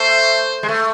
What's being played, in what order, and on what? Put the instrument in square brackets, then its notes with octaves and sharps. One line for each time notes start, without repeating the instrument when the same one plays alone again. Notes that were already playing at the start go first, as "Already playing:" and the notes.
Already playing: [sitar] A3 [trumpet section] C5
[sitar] G#3
A3